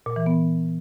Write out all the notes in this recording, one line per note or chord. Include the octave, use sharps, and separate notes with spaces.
A#2
E3
B3